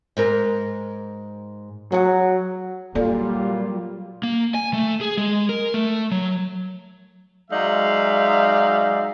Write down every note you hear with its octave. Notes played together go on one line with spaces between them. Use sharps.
G#2 A#4
F#3 G#4 F#5
A#2 F#3 G3 A#3 F4 A4 D5
A#3
G#5
A3
G#4
G#3
A#4
A3
F#3
F#3 G#3 D#4 D5 E5 F5